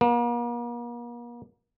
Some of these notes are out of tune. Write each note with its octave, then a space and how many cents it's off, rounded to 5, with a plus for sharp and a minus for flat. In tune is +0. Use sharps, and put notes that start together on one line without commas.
A#3 +40